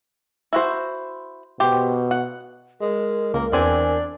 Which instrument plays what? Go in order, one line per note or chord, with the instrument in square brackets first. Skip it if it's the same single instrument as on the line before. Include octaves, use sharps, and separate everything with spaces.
[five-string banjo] E4 F#4 C5
[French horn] B2 [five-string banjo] G4 C5
[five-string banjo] F#5
[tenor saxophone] G#3 [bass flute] A#4
[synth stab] C#2 [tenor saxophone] A#3
[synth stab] E2 C4 G#5 [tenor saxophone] D4